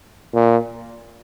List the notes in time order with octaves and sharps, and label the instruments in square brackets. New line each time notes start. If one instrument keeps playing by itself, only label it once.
[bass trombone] A#2